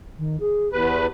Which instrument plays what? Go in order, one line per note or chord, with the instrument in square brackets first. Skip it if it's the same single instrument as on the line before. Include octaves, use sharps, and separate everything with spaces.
[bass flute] D#3
G#4
[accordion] E2 B4 [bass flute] G4